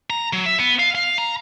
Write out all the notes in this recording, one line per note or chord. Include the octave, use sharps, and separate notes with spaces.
A#5
F#3
E5
B3
F5
F5
A#5